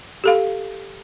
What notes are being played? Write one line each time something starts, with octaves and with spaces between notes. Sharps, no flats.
G4 A4 F5